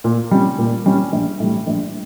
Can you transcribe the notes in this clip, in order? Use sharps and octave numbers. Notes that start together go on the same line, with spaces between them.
A#2
G3 C#4
A#2
G3 C#4
A#1
A2 G3
A#1